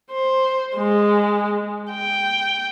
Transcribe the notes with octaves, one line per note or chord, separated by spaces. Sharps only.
C5
G#3
G5